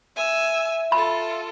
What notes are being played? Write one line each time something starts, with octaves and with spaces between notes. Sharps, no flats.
E5 G#5 E6
F4 A4 B5